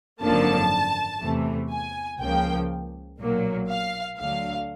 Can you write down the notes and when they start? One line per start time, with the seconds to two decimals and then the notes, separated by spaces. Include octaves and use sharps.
0.21 G#1 F#2 D3 F3 A#3 A5
1.21 E2 C3 E3 A3
1.70 G#5
2.20 C#2 C#3 F3 A#3 G5
3.19 B1 A#2 F#3 A#3
3.69 F5
4.18 D2 D3 F#3 F5